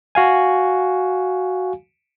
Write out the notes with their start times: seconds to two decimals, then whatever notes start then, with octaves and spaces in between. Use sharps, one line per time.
0.15 F#4 F5 G#5